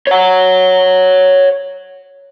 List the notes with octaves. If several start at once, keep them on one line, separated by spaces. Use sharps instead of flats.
C#5 F#5